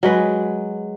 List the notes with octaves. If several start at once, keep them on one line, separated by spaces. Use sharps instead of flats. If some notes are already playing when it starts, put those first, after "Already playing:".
F#3 G#3 B4